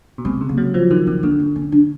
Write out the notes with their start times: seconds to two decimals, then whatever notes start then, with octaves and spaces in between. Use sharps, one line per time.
0.18 B2
0.25 C3 G#3
0.41 C#3
0.49 A#3
0.58 F#3
0.74 F3 B3
0.90 D#3 C4
1.07 D#3 C4
1.23 D3 B3
1.40 C4
1.56 C#4
1.72 D4